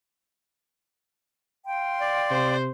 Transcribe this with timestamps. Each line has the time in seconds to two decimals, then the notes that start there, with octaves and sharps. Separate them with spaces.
1.66 F5 G5 C6
2.01 D5
2.31 C3 C5